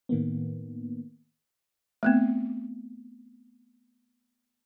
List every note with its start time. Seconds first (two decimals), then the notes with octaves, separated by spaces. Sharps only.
0.09 A2 D#3 A#3 B3
2.03 A3 B3 C4